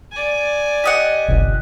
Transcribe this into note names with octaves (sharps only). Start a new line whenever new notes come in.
D5 G#5
G4 D#5 F#5
G1 C2